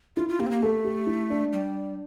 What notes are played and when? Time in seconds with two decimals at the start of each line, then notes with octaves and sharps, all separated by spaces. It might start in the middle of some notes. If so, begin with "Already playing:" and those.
0.16 E4 F4
0.29 F4
0.39 A#3 G4
0.46 C4
0.51 A#3
0.62 A3 A4
0.85 G4
1.07 E4
1.30 D4
1.53 G3